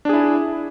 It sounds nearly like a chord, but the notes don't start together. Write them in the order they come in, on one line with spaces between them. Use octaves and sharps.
D4 G#4 E4